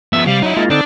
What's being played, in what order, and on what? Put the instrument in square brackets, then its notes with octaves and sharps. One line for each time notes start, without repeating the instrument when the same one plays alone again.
[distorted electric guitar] F3 B3 [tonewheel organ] E5 E6
[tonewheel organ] C3 F5 [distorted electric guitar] G3
[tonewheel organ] F#3 [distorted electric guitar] D#4 E4
[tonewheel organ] G#3 A#3 F4
[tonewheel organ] D3 C4 D#4 [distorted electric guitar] D4